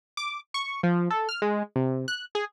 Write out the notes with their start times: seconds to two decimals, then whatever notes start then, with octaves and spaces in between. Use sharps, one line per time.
0.17 D6
0.54 C#6
0.83 F3
1.10 A4
1.29 F6
1.42 G#3
1.76 C3
2.08 F#6
2.35 G#4